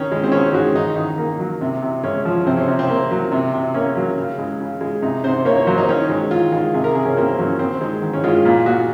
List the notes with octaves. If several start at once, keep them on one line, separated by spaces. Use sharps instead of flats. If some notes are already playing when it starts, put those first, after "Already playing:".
Already playing: D#3 C#4
G#3
C4
D#3 C#4
G#3 F#4
D#3 D#4
D#3 D#4
A#3
F#3
C3
C3
G#3 C#4
F3
C3 C4
C#4
C3
C4
A#3
F#3
C3
C3
A#3 C#4
F#3
C#3
G#3
C#3
G#3
C3 D#4
C3 C5
A#3 C#5
C#5
F#3 C5
D#4
D#3 C#4
G#3
D#3 F4
G#3
C3 G#4
A#4
C3 G#4
C#4
A#3 C4
F#3 C#4
D#3 C4
G#3
D#3
C#4
G#3 F4
F4
A#2 F4
A#2 F#4